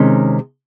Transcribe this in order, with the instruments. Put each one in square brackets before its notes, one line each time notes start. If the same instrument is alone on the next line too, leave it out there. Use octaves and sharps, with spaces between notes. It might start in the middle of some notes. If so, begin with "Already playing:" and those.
Already playing: [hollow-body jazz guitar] C3 D#3 G#3 C#4